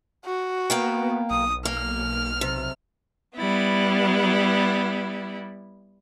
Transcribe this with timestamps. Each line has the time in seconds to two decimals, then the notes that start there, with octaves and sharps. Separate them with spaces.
0.25 F#4
0.70 A#3 B3 F5 G5
1.31 B1 D#6
1.65 A#3 F6
2.41 C3
3.36 G3 B3 E4